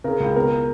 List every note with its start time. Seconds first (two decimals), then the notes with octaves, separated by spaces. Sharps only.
0.04 C#3 A#4
0.20 C#2
0.36 B2 A#4